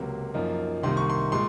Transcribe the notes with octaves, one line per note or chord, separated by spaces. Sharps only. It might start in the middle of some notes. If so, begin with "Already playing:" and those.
Already playing: C#2 C3 F#3 A#3
F#2 F3 A#3 D#4
C2 C3 D#3 A#3 C6
C#6
C6
A#2 G#3 C6